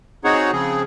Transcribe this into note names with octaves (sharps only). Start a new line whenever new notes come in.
C4 D#4 F#4 G#4 C#5 F#5
C#3 F3 C4 G#4